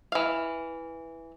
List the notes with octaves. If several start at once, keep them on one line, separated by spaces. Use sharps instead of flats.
E3 F5